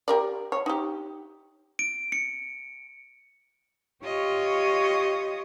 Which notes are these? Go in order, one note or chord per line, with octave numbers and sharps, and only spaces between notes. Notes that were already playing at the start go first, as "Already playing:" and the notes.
G4 A#4 D5
C#5
D#4 G4
D7
C#7
F4 G4 C#5 D#5 C#6